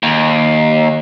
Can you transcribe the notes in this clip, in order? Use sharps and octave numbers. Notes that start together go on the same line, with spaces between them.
D#2